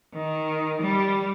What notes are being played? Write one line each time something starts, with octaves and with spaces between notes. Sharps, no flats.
D#3
G3